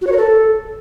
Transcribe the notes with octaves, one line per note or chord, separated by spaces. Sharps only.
F#4
C#5
A#4
A4